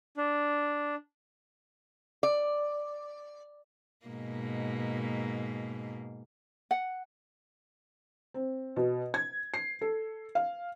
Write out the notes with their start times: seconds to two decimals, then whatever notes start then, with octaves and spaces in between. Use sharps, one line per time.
0.17 D4
2.23 D5
4.06 G#2 B2 A#3
6.71 F#5
8.34 C4
8.76 B2
9.14 G#6
9.54 C7
9.81 A4
10.35 F5